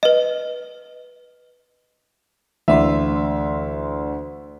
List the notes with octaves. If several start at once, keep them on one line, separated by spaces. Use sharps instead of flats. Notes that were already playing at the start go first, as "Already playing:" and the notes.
B4 D#5
D2 E3 D5 E5 C6